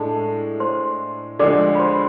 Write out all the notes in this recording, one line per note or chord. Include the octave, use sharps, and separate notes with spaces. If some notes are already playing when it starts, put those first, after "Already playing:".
Already playing: A2 G#3 D4 A4 A5
C5 C6
D2 D3 F3 G#3 D5 D6
B5
C5 C6